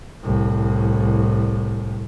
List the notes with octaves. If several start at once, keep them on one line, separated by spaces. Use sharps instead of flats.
C2 A2